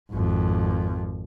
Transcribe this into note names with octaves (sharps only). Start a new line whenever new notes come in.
G#1 F2